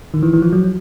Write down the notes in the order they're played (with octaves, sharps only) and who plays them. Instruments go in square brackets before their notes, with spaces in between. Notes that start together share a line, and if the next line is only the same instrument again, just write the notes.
[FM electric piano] D#3
E3
E3
F3
F#3